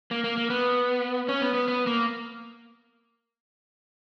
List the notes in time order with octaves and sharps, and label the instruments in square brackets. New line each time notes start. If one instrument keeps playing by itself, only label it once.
[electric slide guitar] A#3
A#3
A#3
B3
C#4
B3
B3
B3
A#3